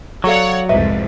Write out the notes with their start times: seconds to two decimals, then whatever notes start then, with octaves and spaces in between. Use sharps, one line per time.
0.24 F#3 F#4 A4 C#5 D5 F5 F#5
0.69 C2 F2 G#2 B4 D#5 E5